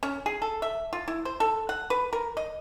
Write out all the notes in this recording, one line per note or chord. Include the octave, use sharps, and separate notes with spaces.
C#4
G#4
A4
E5
F4
E4
C5
A4
F#5
B4
A#4
D#5